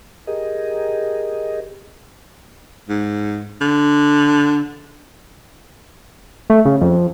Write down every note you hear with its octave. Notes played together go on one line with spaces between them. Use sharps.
G4 G#4 A#4 D#5
G#2
D3
A3
C#3
F2